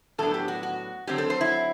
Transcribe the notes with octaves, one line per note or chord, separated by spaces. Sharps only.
A2 F#3 B3 D4 A4
G4
F#4
F#4
D3 F#3 C4 G4
A4
C5
E4